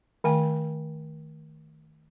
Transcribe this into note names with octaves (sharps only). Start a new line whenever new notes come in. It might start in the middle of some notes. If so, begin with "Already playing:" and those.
D#3 A3 G5 G#5